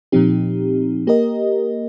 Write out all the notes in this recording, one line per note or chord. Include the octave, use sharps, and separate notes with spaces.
A#2 F3 C4 D#4 G4
A#3 G4 A#4 D#5